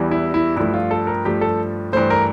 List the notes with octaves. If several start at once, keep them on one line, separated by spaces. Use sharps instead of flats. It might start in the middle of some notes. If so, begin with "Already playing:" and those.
Already playing: E2 E3 G3
E4
E4
G2 F3 A3 E4
F4
A4
A#4
G2 F3 A3 G4
A4
G2 E3 A3 C5
A#4